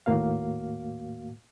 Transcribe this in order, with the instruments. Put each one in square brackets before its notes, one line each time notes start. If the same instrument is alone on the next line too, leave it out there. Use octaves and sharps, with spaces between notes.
[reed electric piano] D#2 A2 A#3 F#4 F5